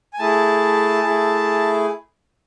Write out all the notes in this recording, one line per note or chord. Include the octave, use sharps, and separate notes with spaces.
G#5
A3 E4 G#4 A5
A3 E4 G#4